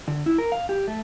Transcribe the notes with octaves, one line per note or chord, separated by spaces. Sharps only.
D3
E4
A#4
F5
G4
A3